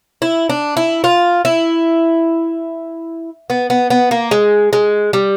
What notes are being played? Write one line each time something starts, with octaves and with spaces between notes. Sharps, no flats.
E4
D4
E4
F4
E4
B3
B3
B3
A#3
G#3
G#3
G3